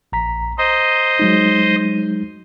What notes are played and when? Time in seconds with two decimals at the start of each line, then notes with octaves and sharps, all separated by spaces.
0.12 A#1 A#5 B6
0.58 C5 D#5 A#5
1.19 F#3 G#3 D#4